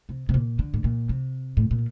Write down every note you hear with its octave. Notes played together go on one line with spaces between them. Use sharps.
C3
C3
A#2
D3
A2
A#2
C3
A2
A#2